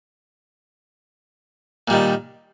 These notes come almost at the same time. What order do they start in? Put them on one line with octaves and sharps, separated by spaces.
A#2 G3 D#3